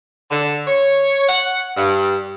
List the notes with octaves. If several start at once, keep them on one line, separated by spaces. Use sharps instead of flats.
D3
C#5
F#5
G2